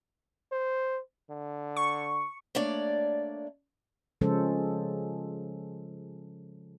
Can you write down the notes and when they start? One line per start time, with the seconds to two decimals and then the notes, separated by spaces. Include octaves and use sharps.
0.52 C5
1.30 D3
1.76 C#6
2.55 A3 A#3 D4 C#5 D5
4.21 C#3 F3 G#3 C#4 A4 C5